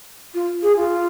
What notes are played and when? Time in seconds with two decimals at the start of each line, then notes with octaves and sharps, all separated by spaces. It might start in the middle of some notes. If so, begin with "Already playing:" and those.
0.34 F4
0.63 G#4
0.77 F4